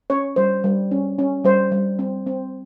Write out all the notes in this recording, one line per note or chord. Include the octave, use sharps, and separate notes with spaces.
C#4 C#5
G3 C5
G3
C#4
C#4
G3 C5
G3
C4
C4